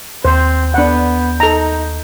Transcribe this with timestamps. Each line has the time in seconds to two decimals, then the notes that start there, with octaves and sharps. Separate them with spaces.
0.25 D#2 C4 C5 G6
0.74 B3 D4 F#5
1.40 D#4 A4 A#5